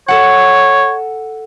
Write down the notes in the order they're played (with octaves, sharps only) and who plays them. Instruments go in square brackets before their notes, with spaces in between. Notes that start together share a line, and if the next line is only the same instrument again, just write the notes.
[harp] A4 F#5 [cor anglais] C#5